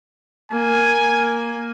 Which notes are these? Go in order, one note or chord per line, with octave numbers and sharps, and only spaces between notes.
A#3 G#5